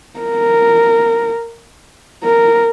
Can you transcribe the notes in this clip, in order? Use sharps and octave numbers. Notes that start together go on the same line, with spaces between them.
A#4
A#4